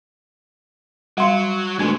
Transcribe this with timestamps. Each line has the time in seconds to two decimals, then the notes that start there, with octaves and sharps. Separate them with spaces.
1.18 F#3 G3 F5 F#5 C6
1.79 D2 G#3 B3 G#5 G#6